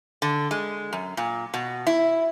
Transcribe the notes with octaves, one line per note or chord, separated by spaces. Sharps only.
D3
G#3
F#2
A#2
B2
E4